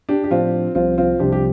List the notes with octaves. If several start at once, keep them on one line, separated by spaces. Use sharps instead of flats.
D4 G4
G4
A2 F3 C4 D4 F4
C2 C3 F3 C4 F4
C4 F4
C2 C3 F3 D4 G4
G4